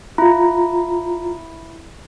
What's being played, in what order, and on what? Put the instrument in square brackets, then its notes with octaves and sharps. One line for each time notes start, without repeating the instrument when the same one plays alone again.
[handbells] E4 [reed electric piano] F4 A#5